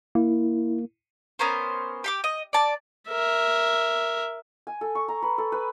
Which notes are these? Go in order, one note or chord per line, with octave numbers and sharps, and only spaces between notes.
A#3 E4
B3 C#4 A#4 C5
G4 C6 D6
D#5
D5 A5
A#4 E5
G#5
A4
C#6
A#5
B4
A4
B4